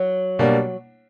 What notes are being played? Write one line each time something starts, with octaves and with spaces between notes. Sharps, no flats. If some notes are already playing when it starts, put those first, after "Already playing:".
Already playing: F#3
B2 G3 A#3 D4